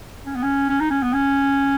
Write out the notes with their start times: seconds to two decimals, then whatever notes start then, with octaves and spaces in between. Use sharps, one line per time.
0.26 C#4
0.35 B3
0.43 C#4
0.69 C#4
0.80 D#4
0.90 C#4
1.02 B3
1.13 C#4